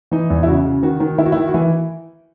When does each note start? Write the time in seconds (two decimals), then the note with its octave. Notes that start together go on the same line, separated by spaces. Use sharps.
0.11 E3 D#4
0.30 E2
0.43 E4
0.47 C#3 F#4
0.65 C#3
0.83 D#3 F#4
1.00 D#3
1.18 D#3 E4
1.26 F#4
1.32 D#3 E4
1.48 F#4
1.54 E3 E4